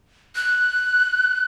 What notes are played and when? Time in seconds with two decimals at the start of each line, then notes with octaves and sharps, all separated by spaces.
0.35 F#6